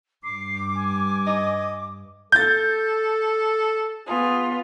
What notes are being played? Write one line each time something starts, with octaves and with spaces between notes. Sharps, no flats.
G2 D6 C7
G#5
D#5
A4 G6 A6
B3 F4 G#4